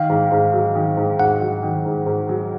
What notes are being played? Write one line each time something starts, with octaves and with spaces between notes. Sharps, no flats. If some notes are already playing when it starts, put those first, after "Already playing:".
Already playing: D#3 F5
G#2
G#2
F#3
D#3
G#2
G#2 F#5
F#3
D#3
G#2
G#2
F#3